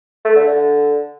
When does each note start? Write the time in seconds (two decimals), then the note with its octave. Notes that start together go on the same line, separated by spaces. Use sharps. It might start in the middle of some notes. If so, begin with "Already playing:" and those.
0.25 A3
0.36 D3
0.47 D3